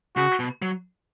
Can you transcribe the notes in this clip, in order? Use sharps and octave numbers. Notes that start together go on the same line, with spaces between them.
C#3 F#4
B2
F#3